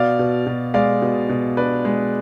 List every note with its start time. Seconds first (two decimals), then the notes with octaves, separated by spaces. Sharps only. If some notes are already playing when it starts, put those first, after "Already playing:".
Already playing: B2 D5 F5
0.19 B2
0.47 B2
0.74 G#3 D5 F5
1.02 B2
1.29 B2
1.57 D4 B4 D5
1.85 G#3